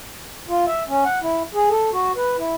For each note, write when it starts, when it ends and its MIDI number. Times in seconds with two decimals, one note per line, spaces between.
0.49 0.65 65
0.67 0.83 76
0.87 1.04 61
1.05 1.19 78
1.22 1.43 64
1.54 1.69 68
1.70 1.90 69
1.93 2.12 66
2.16 2.37 71
2.38 2.55 64